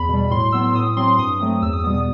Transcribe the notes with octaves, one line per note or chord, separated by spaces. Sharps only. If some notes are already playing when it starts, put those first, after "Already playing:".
Already playing: E2 B5
B2 G3
A2 C6
F#3 B3 E6
A2 D#6
F#3 C4 C6
G2 D#6
F#3 A3 C4
E2 E6
D#6
B2 G3 B3 D#6
D#6